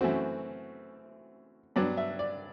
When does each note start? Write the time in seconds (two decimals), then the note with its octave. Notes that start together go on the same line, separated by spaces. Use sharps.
0.01 F#2 E3 A3 C4 F#4
1.76 G2 F#3 B3 D4 D5
1.97 E5
2.19 D5